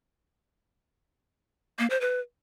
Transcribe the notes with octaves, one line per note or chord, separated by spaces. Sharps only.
A#3
C5
B4